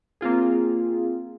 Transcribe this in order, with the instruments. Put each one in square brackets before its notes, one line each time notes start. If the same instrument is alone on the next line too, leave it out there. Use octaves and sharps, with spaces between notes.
[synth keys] A#3 C4 F4 G#4